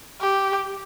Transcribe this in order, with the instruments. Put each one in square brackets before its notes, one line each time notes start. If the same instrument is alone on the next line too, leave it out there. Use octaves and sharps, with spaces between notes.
[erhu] G4